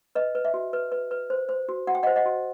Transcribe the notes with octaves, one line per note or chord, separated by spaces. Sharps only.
B4 D#5
B4
E5
F#4
B4
B4
B4
C5
C5
F#4
F#4 F#5
G5
D#5 F#5
C5
D#5 F#5
F#4